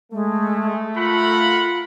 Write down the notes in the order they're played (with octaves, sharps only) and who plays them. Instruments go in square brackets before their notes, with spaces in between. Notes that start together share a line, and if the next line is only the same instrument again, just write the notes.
[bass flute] G#3 [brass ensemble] A3
[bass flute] F4 [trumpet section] A#4 F#5 B5